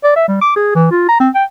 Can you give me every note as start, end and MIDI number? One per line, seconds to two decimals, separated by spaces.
0.04 0.14 74
0.16 0.28 76
0.28 0.38 55
0.41 0.54 86
0.56 0.75 68
0.75 0.88 52
0.91 1.08 65
1.09 1.19 82
1.20 1.29 60
1.35 1.44 79